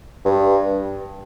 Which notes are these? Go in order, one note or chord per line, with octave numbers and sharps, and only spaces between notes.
G2